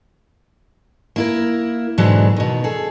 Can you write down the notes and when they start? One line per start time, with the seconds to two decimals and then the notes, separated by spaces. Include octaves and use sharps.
1.16 A#3 E4 A#4
1.98 G#2 B2 D3 E3 F#3 G#3
2.36 B2 D#3
2.64 G#4 A4